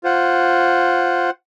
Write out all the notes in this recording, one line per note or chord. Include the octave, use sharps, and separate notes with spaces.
F4 C5 F#5